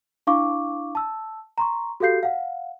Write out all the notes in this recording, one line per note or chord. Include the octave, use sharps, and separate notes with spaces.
D4 E4 F5 C#6 D6
A5 E6
A#5 C6 C#6
F#4 G4 A4 F5 G6 C7
F5 F#5